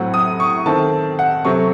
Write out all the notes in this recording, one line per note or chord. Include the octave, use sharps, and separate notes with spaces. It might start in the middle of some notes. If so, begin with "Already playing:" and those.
Already playing: A2 F#3 C4 F#5
D#6
C#6
D#3 A3 C4 A5
F#5
C3 F#3 A3 C4 C#6